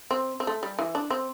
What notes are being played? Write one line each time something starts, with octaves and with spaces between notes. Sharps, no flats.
C4
C4
A3
G3
E3
D4
C4